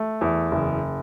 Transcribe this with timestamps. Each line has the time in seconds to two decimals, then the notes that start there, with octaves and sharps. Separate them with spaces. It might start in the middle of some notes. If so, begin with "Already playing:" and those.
Already playing: A3
0.21 E2
0.51 F#1